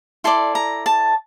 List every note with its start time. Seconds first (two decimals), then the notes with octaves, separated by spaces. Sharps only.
0.24 E4 A4 D5 C6
0.55 A#5
0.86 A5